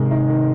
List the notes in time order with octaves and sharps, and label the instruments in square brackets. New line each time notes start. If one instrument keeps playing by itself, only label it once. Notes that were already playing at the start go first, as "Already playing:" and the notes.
Already playing: [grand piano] G#2 D#3 G#3 [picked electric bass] C3
[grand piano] D#4
D#3